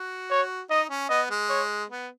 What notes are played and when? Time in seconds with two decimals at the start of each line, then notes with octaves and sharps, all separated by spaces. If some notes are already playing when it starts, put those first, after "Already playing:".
Already playing: F#4
0.30 C#5
0.70 D#4 D#5
0.90 C#4
1.09 B3 D#5
1.30 G#3
1.50 C#5
1.90 B3